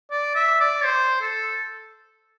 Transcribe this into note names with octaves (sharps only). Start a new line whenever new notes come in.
D5
E5
D5
C5
A4